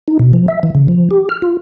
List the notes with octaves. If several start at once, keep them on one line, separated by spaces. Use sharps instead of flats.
D#4
B2
F3
E5
E3
C#3
F3
G4
F6
F4